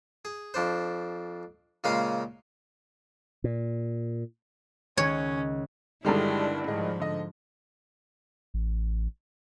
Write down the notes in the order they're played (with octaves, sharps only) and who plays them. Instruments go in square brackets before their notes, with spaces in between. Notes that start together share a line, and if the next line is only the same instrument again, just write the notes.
[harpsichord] G#4
F2 D4 C5
A#2 C#3 G#3 A#3 F5 C6
[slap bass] A#2
[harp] C#2 D#3 F#6 [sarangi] C#4 [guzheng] C#5
[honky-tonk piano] G2 D3 D#3 [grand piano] G3 G#3 A4 [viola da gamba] D4 E4
[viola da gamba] G#2 F3 [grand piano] G#4 D#5
[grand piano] D3 D#5
[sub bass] A1